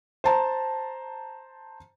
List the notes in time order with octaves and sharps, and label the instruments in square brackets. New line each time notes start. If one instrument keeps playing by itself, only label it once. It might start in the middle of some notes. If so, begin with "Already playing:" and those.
[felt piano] C5 A5 A#5